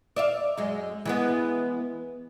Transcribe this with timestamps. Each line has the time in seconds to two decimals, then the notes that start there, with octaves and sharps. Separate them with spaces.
0.16 D5 E5 F5
0.57 F#2 G#3
1.05 E3 G#3 B3